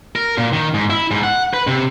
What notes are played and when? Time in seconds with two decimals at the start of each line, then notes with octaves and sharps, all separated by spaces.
0.16 A#4
0.38 A#2
0.53 D#3
0.74 G#2
0.90 E4
1.11 G#2
1.24 F#5
1.54 B4
1.67 C3